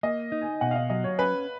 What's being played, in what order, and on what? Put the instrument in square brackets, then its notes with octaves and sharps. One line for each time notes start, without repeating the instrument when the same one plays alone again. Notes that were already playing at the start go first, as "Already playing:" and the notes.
[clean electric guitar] A#3 [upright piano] D#5
[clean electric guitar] D#4
[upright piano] G#5
[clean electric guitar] B2 [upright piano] F#5
[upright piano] F5
D#5
[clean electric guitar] F#3 [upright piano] D#5
[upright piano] C#5
[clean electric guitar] C#4 [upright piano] B4